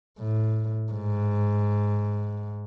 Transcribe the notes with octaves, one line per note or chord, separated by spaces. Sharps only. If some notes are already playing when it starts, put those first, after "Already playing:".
A2
G#2